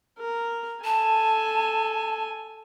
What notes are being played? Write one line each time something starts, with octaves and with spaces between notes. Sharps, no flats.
A#4
A4 G#5 A5